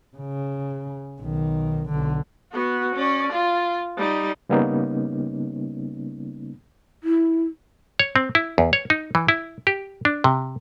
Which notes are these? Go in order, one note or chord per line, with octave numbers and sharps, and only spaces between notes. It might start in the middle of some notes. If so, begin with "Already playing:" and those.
C#3
B1 D#3
B1 D3
B3 F#4
C#4 D5
F4
G3 D#4
C#3 G3 A#3 B3 C#4 D#4
E4
C#5
C4
E4
E2
C#5
D#4
E3
E4
G4
D4
C3